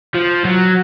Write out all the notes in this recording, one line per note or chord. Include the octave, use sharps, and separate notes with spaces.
F3
F#3